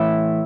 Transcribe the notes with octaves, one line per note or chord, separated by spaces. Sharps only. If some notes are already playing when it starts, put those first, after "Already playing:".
Already playing: A2 E3 E5